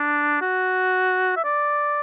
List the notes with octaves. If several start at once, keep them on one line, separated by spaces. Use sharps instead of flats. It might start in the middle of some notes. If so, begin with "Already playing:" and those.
Already playing: D4
F#4
E5
D5